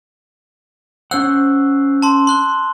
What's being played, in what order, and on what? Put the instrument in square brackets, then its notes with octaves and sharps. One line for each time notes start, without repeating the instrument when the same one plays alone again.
[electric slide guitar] C#4 C5 F#5 [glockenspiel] E6 F#6
[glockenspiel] A5 C6
C6 F#6 G7